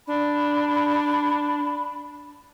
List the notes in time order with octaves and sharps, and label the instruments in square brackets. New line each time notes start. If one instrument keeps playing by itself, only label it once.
[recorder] D4 [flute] B5